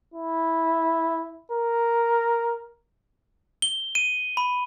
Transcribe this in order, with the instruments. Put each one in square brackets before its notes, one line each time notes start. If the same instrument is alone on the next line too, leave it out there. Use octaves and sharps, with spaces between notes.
[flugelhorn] E4
A#4
[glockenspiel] G7
D#7
B5